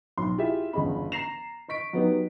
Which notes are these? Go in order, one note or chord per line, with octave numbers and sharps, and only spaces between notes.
B1 C6
E4 F4 G4 G#4 E5
G1 E2 C#3 G#4 D#5 B5
A#5 A#6 C7 E7 F7
D#5 C#6 B6 D7
F#3 B3 D#4 G4